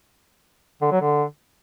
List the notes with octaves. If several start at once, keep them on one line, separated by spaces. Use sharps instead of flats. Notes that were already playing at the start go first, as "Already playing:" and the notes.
D3
F#3
D3